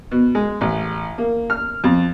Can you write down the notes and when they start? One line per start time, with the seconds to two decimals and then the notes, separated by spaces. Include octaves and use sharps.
0.11 B2
0.35 G#3
0.61 A1
1.18 A#3
1.50 F6
1.84 F2